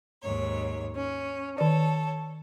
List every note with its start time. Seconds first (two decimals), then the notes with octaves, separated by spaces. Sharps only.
0.23 D#2 G#2 C#5
0.96 C#4
1.58 D#3 A4 C#5 D5